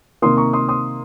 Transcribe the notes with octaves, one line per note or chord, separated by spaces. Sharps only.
C3 D#3 A#3 C6 D#6
A#5 C#6
C6 D#6
C6 D#6